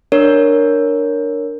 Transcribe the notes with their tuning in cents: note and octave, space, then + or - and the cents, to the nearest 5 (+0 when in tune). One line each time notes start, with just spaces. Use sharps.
D4 +10 A#4 +0 C#5 +0